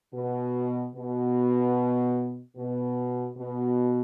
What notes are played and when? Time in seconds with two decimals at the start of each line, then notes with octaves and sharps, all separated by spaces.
0.14 B2
0.96 B2
2.57 B2
3.37 B2